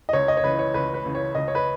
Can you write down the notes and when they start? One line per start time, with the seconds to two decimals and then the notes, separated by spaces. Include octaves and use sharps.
0.09 D#5
0.13 C#2 C#5
0.28 D#5
0.37 C#5
0.43 C#3 E3 B4
0.59 C#5
0.74 C#2 B4
0.94 B4
1.05 C#3 E3
1.15 C#5
1.35 C#2 D#5
1.48 C#5
1.55 B4